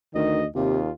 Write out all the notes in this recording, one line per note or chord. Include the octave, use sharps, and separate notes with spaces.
D2 D#3 D#5
D#2 C3 F4